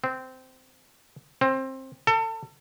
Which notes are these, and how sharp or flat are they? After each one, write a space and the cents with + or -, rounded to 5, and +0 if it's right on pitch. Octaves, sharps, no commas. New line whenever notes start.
C4 -15
C4 +20
A4 +30